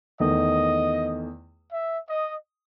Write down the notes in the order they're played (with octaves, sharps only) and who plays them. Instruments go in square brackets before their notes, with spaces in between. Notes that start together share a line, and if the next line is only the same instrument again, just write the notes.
[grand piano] E2 D#3 A3 [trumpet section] D#5
[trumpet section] E5
D#5